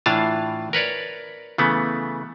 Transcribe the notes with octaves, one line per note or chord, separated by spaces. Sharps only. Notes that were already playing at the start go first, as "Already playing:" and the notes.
A2 E3 D4 F4 F5 A5
A#4 B4 C#5 D5
C#3 E3 A3 B3